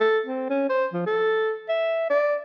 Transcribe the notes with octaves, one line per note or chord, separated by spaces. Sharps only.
A4
C4
C#4
C5
F3
A4
E5
D5